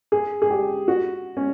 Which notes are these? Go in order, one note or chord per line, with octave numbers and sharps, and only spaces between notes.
G#4
G#4
G4
F#4
C#4